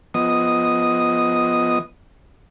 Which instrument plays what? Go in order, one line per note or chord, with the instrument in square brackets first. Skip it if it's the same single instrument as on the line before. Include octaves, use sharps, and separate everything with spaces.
[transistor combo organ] F3 B3 D#5 D#6